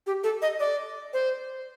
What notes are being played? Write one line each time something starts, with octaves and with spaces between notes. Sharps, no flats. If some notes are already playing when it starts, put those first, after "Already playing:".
G4
A4
D#5
D5
C5